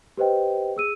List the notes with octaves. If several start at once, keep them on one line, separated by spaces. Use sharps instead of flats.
G4 B4 C5 D#5 G5
G#4 E6 D#7